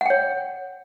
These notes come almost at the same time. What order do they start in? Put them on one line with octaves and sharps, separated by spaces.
F#5 G5 C#5